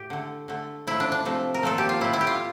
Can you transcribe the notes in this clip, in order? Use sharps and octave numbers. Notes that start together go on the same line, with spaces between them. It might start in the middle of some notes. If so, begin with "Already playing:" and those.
Already playing: A2 G4
D3 A3
D3 A3
A2 F3 A3 E4
D4
D4
C3 F3 A3
A#4
A#2 F3 A3 A4
G4
F4
A2 G3 E4
E4
G4
F4